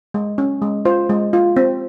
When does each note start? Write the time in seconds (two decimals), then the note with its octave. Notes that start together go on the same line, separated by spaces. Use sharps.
0.14 G#3
0.38 C#4
0.62 G#3
0.85 F4 C5
1.10 G#3
1.33 F4
1.56 C4